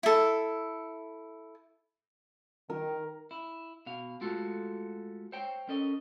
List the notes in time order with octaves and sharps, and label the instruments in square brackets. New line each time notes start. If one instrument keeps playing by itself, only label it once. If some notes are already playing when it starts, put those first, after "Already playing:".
[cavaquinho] E4 A4
[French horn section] D#3 [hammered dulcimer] A#4
[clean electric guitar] E4
B2 F5
G#3 A3 F4 F#4 A4
C5 C#5 G5
C#4 A4 A#4 D#5